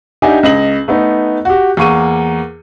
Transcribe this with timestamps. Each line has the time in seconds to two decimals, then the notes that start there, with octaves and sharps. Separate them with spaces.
0.22 D4 D#4 G4 E5 F#5 G#5
0.43 C#2 D#5 F#7
0.88 A3 B3 D#4
1.45 F#4 G4
1.77 E2 A#3 C#6 D#7